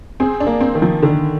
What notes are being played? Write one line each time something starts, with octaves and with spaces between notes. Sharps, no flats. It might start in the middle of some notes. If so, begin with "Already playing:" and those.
C4 G#4
D4
A#3
C4
D#3
F3
D3 D#3